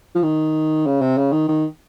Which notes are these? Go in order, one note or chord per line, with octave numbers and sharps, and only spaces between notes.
F3
D#3
C#3
C3
C#3
D#3
D#3